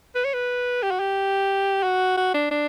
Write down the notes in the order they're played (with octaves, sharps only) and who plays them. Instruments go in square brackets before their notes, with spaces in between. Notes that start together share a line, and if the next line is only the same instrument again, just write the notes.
[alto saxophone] B4
C#5
B4
G4
F#4
G4
F#4
F#4
D4
D4